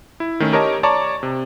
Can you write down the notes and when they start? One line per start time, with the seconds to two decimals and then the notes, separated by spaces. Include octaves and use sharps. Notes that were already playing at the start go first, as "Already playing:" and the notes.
0.20 E4
0.40 D#3 A3 C#4
0.52 G4 A#4 C#5 D#5 A5
0.83 C#5 D5 A5 A#5 C#6 D6
1.23 C3